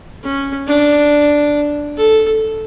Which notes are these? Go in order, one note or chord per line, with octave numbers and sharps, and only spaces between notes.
C#4
D4
A4